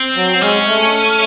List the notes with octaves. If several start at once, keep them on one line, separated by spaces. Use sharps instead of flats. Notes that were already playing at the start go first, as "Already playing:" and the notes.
Already playing: C4
F#3
G#3 C#4
A3